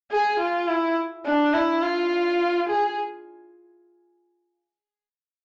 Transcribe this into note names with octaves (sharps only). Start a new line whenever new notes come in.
G#4
F4
E4
D4
E4
F4
G#4